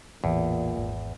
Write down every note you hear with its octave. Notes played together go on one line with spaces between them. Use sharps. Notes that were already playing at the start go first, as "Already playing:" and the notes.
A1 E2 A#2 E3
G#1